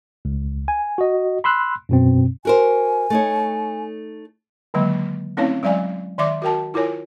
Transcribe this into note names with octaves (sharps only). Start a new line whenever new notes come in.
C#2
G#5
F#4 D#5
B5 C6 E6 F#6
F#2 B2 C4
F#4 A#4 C5 G#5
A3 D#4 C#5
D3 D#3 F#3 G#3 A#3
A3 C4 C#4 E4 C#5 F5
F#3 G#3 D5 F5 G#5
D#3 D5 E5 C6 D6
F#4 A#4 G5 A5
E4 F4 A#4 C#5 G#5